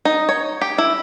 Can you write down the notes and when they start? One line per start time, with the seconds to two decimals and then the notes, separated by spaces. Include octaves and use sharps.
0.05 D#4
0.29 C#5
0.61 G4
0.78 E4